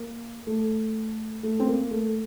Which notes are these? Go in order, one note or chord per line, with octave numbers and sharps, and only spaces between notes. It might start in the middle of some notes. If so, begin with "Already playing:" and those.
Already playing: A#3
A3
A3
C4
A#3
A3